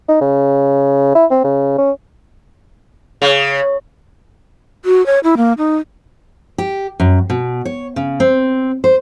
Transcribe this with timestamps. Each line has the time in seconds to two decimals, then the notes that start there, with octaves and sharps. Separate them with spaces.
0.08 D#4
0.21 C#3
1.15 E4
1.30 C4
1.44 C#3
1.78 C#4
3.22 C#3
4.85 F#4
5.06 C#5
5.24 E4
5.37 A#3
5.58 D#4
6.58 G4
7.00 F#2
7.30 B2
7.65 C#5
7.96 C#3
8.20 C4
8.84 C5